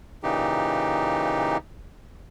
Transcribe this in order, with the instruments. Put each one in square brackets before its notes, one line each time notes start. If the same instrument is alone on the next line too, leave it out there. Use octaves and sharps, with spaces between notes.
[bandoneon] A#2 C#3 E3 D#4 G4